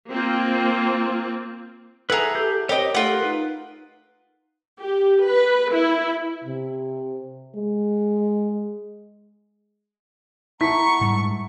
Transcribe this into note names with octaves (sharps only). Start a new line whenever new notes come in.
A#3 C4 F4
E4 G#4 A4 B4 F#5 A#5
G4 G6
C4 G4 A#4 C#5 D#5
A3 F4 G4 A#4 F#5
D#4 B4
G4
B4
E4
C3
G#3
E4 F#5 A5 A#5 C#6 B6
G#2 G3 G#3